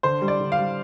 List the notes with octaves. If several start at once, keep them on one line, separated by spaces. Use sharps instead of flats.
D3 C5
G3
D5
D3
F5
G3